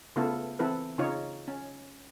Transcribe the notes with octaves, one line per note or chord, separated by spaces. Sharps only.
C#3 A3 B3 E4 F4 A4
E3 C4 E4 A4 B4
C#3 D#4 F4 C#5
C#4